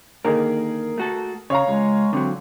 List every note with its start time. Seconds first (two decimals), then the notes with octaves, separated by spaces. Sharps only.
0.25 D3 D#3 A#3 G#4 A#4
0.98 A3 F#4 A4
1.50 C#3 C#5 F5 A#5
1.68 C#2 G#3
2.13 D3 F#3 C4